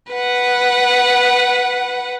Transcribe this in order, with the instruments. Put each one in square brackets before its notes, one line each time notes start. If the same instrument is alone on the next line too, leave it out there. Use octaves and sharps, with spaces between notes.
[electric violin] B4 F#5